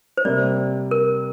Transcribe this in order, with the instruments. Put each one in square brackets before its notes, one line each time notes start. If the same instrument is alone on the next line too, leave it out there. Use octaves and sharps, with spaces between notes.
[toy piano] C5
[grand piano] C3 G3 A#3 [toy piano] D5
[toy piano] A#4